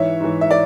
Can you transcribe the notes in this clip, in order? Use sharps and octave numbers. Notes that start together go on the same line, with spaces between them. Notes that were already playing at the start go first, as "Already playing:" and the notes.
Already playing: G#2 E3 C#5 E5
G#2 E3
E5
D5